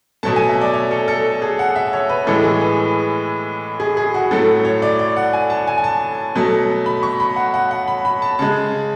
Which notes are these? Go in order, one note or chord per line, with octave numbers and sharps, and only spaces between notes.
B2 F#3 A3 A5
G#5
E5
D5
C#5
A4
A4
G#4
F#5
E5
C#5
B4
A2 E3 G#3 A4
G#4
B4
G#4
G#4
F#4
A2 F#3 A3 A4
C#5
D5
D5
F#5
G#5
A5
G#5
G#5
A5
B2 F#3 A3
B5
C#6
B5
F#5
F#5
F#5
B5
B5
A5
C#3 G#3 A5